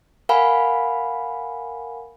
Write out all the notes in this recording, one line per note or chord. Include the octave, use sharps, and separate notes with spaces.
A#4 F5 F#5 G#5 B5